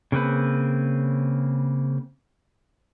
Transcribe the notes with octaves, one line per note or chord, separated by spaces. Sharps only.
C#3 A#3 C4 B4